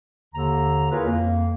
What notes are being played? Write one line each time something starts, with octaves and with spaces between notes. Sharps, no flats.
D#2 D3 A#5
E4 F4 G#4 A#4 B4 C#5
F2 A#3